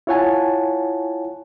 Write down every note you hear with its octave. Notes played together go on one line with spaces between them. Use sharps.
E4 F4 C#5 F#5 G#5 A5